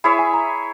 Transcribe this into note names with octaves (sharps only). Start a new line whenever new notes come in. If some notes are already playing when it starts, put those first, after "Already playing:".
E4 G#4 C#5 E5 B5
G#5
A#5